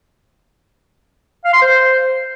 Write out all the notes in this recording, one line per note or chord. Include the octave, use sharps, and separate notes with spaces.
F5
C6
C5